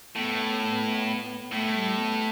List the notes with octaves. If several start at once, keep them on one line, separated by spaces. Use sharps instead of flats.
A2 B3
A2 A3
G3
B3